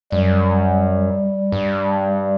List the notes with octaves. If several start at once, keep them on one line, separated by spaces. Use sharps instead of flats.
F#2 G3
G2